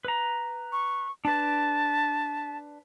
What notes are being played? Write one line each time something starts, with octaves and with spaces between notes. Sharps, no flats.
B4 A#5
C#6
D4 B4 A5